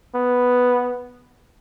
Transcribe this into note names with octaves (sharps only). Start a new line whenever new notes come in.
B3